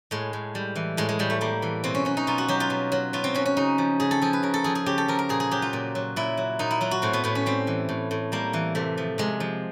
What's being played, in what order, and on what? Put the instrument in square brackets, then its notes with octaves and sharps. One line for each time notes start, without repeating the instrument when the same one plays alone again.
[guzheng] A2 G#3
A2
G3
E3
A2 G#3
G#3
A2 G3
A3
G3 A#3
E3
B2 C4
C#4
F#3 C#4
D#4
B2 F4
F#4
F#3 G4
F4
B2
F#3
B2 F4
C4
F#3 C#4
C#4
C#3 D#4
F3
C#3 G#4
A4
F3 G#4
B4
C#3 A#4
A4
F3 G#4
G#4
C#3 G4
A4
F3 A#4
A#4
A#2 G#4
G#4
F#3 G4
F4
A#2
F#3
A#2 E4
F#3
A#2 D#4
E4
F#3 F4
F#4
A2 C4
B3
A2 B3
C#4
G3 C4
E3
A2
A2
G3 A#3
E3
C3 A3
F3
C3 G#3
F3